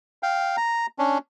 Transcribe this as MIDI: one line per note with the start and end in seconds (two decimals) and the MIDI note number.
0.23 0.56 77
0.23 0.56 79
0.57 0.86 82
0.99 1.18 61
0.99 1.18 62